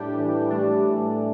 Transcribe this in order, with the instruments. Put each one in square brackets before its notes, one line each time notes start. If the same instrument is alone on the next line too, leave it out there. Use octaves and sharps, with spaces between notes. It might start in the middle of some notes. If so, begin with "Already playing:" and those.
Already playing: [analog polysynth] A2 G3 D4 G4
[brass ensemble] E3
[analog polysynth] A2 A3 D4 [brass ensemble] G3
[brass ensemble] E3